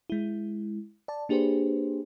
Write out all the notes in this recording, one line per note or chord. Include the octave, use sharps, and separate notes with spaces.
G#3 E4
D5 A5
A#3 D4 G4 G#4 B4 C5